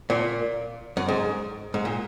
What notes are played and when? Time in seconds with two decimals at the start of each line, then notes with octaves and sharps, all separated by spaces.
0.10 A#2
0.97 F#2
1.09 G#2
1.74 G#2
1.85 A#2